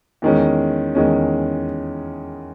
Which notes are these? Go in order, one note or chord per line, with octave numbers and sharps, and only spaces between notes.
E2 D#3 G#3 C#4
E2 D#3 G#3 C#4